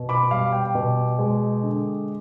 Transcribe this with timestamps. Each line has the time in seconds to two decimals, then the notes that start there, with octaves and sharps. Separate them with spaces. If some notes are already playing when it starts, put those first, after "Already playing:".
Already playing: B2
0.09 B5 D6
0.31 G3 F5
0.53 G5
0.75 B2
1.19 G#3
1.63 D3